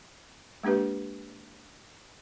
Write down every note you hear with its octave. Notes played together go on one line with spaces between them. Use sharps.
G#3 A#3 D4 G4 B4